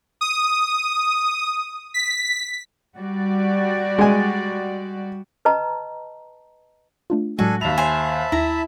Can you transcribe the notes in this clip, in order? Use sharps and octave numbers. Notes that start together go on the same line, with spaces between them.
D#6
B6
G3 F#4 D5
G#3 G#5
B4 D#5 A5 A#5
A3 D4 F4
A2 F#3 G#3 D4 F#4 A4 G#5
D#2 E5 A5 B5 F7
C5 C#5 G#5 F#6 G#6
D#2 E4 A#5